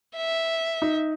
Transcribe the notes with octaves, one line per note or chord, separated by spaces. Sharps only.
E5
D#4